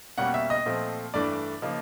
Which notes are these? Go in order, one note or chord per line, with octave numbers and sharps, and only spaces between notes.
B2 G3 A#3 C#4 F#5
E5
D#5
A#2 F3 A3 C4
G2 E3 A3 D4 D5
C#3 F3 A#3 D#4